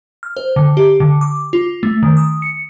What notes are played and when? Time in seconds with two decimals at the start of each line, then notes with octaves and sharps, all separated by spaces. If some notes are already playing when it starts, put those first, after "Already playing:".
0.23 F6
0.37 C5
0.56 D3
0.77 G4
1.00 D3
1.21 D6
1.53 F4
1.83 A3
2.03 D#3
2.17 D#6
2.42 C#7